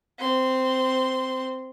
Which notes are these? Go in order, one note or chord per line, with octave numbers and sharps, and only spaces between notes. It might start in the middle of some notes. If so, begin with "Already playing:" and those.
C4 C6